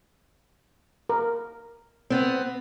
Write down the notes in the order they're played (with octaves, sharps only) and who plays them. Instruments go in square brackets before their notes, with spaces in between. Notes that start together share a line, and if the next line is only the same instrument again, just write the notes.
[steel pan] A#4
[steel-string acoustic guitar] B3 C4